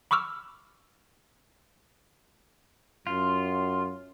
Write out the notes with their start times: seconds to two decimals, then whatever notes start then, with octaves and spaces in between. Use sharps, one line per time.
0.11 B5 C#6 D6 E6 F6
3.07 F#2 F4